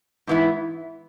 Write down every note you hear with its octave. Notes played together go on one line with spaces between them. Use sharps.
G#2 E3 B3 E4